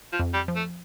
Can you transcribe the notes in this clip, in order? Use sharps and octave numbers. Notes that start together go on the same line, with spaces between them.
F3
F2
G3
F3
A3